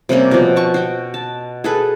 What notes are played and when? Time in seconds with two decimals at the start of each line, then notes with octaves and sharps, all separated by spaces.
0.09 C3 G3 A#3 C#4
0.31 B2 F3
0.56 A5 C#6
0.74 F#4 G5
1.14 A5
1.64 G#4 A4 B4